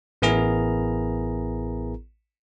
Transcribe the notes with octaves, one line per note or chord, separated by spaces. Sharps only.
A1 B3 E4 G#4 A#4 A#5